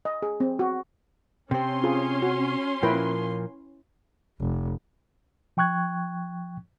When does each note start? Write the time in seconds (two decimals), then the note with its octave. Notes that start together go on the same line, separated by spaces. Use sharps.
0.05 D#5
0.22 G#4
0.40 C4
0.59 F#4
1.51 C3 C4 C#4 C6
1.84 F4 G#4
2.22 F#4
2.83 A#2 F3 A#3 E4 B4 G5
4.40 F1
5.57 F3 G5 C#6 F#6 G#6